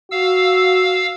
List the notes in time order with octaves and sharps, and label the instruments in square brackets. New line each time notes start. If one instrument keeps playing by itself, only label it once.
[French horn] F#4 [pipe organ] F5 E6